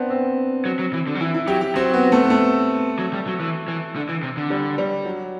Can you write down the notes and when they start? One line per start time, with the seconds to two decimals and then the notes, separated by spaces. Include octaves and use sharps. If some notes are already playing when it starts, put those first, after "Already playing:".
Already playing: B3 C4 D4
0.10 C4
0.65 F#3
0.79 F#3
0.93 E3
1.07 D3
1.15 F#3
1.21 E3 E4
1.34 E4
1.47 F#3 G4
1.61 G4
1.75 F#3 C4
1.94 B3
2.12 A3
2.24 B3
2.30 A3
2.99 F#3
3.13 G3
3.27 F#3
3.40 E3
3.68 E3
3.96 D3
4.09 E3
4.23 C3
4.37 D3
4.50 G3
4.78 G3
5.05 F#3